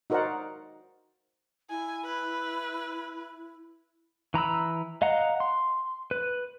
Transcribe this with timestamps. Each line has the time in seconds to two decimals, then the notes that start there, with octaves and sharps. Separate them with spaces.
0.10 D#4 F#4 A#4 C5 D5 F#5
1.70 E4 G#5
2.05 B4
4.34 E3 A#5 B5 E6
5.02 D#5 F5 F#5 A#5
5.40 C6
6.11 B4